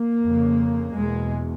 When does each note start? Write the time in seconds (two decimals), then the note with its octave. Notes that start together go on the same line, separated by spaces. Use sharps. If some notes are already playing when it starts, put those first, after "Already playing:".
Already playing: A#3
0.22 F2 C#3
0.93 E2 B2 G#3